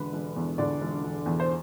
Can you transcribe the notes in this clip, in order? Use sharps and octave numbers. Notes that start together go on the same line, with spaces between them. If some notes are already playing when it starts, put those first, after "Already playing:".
Already playing: E1 D3 B4
E1
E2
D3 D5
E1
E1
E2
C5